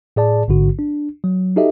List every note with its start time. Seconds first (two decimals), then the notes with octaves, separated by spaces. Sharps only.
0.16 A2 G#4 D5 A5
0.48 A1 G#2 D3 F#4
0.79 D4
1.24 F#3
1.56 D#4 F#4 G4 A4 D#5 E5